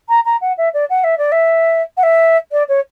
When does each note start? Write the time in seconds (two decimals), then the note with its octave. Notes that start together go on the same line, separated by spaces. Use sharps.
0.08 A#5
0.25 A#5
0.41 F#5
0.57 E5
0.73 D5
0.89 F#5
1.04 E5
1.18 D5
1.31 E5
1.97 F#5
2.03 E5
2.52 D5
2.68 C#5